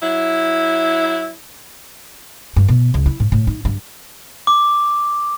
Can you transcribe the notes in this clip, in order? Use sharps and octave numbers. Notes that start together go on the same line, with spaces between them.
F#3 E4
G2
B2
C#2
E4
G#2
A2
D#4
G2
D6